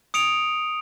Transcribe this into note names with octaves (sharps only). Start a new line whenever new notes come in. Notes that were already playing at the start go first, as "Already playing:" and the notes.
D#6 C#7 D7 F7